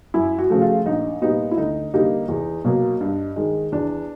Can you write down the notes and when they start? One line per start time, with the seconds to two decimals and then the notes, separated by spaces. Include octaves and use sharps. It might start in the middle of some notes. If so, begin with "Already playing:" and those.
0.14 F#2 E4
0.38 F#4
0.50 C#3 F3 A3
0.62 F4
0.86 A#1 D#4
1.22 A#2 G3 B3 D#4
1.51 E4
1.57 D2 D#4
1.94 D3 G3 A#3 D#4
2.28 E2
2.65 B2 F#3 A#3
3.01 G2
3.36 D#3 G#3
3.72 E2 D4